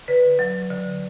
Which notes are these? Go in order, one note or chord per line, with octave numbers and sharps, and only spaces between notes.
D3 B4
F#3
D3